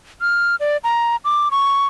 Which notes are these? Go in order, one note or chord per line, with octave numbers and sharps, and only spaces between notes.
F6
D5
A#5
D6
C#6